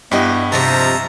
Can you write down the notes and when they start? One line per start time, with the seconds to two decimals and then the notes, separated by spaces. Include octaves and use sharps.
0.11 G2 B3 E4 G4 D#5
0.52 C3 F3 D#4 E5 A5 A#5